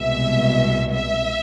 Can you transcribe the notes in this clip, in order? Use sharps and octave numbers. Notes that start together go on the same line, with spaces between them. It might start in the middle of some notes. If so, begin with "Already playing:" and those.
Already playing: C2 B2 G#3 E5
E5